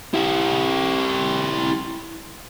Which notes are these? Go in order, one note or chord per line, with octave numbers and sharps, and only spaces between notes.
E4 G4